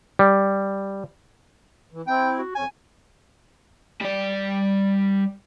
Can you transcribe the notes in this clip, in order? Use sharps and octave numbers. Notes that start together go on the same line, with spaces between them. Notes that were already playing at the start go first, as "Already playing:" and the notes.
G3
E3
C4 E4 G5
F#4
F2 C#4 G#5
G3 D5